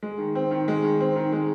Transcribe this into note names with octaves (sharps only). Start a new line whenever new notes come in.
G#3
D#3
C4
D#3
G#3
D#3
C4
D#3
G#3